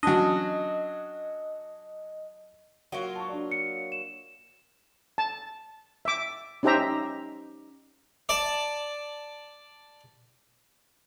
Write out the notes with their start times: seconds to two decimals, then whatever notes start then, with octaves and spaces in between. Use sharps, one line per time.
0.03 F#3 C#4 D4 D#5
2.92 F#3 A#3 F4 F#4 C#6
3.15 A5 C#6
3.29 D4 F#4 D5
3.51 C#7
3.92 E7
5.18 A5
6.05 E5 D6
6.63 C#4 D#4 G4 C5 E5 A#5
8.29 D5 A5